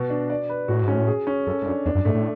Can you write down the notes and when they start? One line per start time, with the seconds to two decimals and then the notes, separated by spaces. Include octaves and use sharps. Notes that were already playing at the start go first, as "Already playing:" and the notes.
Already playing: B2 F#4
0.10 D4
0.30 D5
0.49 B4
0.68 A2 F#4
0.83 G#2
0.88 C#4
0.96 A2
1.07 G#4
1.27 C#4
1.47 F#2 A4
1.62 G#2
1.66 F#2 D4
1.86 E2 D4
1.95 F#2
2.05 G#2 A3
2.14 A2